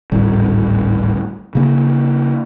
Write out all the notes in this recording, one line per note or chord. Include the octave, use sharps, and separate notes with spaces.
G#1 D2 A2 G3
C#3 A#3 D4